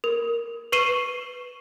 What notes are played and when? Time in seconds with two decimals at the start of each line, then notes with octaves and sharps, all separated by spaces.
0.04 A#4
0.72 B4 C#6 C7 D#7 E7 G7